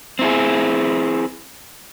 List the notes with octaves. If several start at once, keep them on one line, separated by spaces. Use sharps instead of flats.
C4 E4 G#4